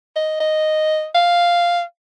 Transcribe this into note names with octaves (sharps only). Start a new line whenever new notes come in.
D#5
D#5
F5